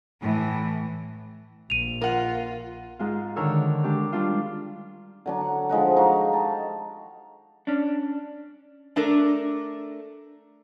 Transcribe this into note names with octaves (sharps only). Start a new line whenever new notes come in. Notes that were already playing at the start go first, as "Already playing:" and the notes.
A2 E3
A#1 D#7 F7
F4 A#4 F#5
G#2 G#3 F4
D3 D#3 A#4 C#5 C#6 E6
G#3 D4 G4
G3 D4 F4
D3 F#3 D4
F#5
F3 G#3 D#5 F#5
D#4 F#4 F5
G4 A5
C#4 D4
A3 D4 A4 A#4